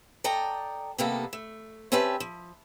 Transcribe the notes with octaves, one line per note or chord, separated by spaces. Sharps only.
A4 D5 D#5 G5 A#5
C3 D#3 G3 A#3 B3 A4
A3
C4 C#4 G4 B4 E5 A5
F3